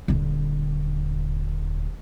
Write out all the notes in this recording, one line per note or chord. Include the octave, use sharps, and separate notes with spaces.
D#1 D3